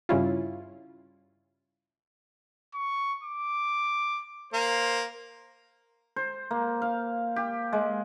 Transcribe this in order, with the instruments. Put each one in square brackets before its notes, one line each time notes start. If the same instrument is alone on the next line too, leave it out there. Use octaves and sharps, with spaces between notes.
[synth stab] G2 C#3 G3 C#4 E4 F4
[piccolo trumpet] C#6
D6
[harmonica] A#3 [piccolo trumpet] C5
[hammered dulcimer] C5
A#3
F5
G4
G#3